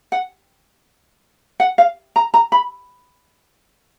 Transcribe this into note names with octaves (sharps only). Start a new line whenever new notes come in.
F#5
F#5
F5
A#5
A#5
B5